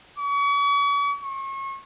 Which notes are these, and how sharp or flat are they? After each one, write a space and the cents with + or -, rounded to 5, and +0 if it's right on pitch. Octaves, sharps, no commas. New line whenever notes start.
C#6 +40
C#6 -35